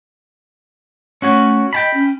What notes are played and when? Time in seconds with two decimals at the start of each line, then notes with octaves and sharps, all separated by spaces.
1.22 A3 C#4 F#4 C#5
1.73 D#5 G5 A5 B5
1.94 C#4